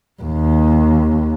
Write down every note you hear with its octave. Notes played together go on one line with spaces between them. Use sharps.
D#2